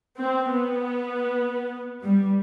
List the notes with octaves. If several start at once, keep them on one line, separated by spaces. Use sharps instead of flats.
C4
B3
G3